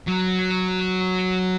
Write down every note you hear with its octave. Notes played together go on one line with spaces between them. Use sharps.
F#3